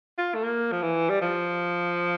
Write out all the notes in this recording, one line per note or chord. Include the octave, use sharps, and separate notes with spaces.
F4
A3
A#3
F3
E3
G3
F3